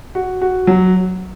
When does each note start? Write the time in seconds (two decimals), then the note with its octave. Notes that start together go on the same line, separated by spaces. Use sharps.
0.15 F#4
0.41 F#4
0.67 F#3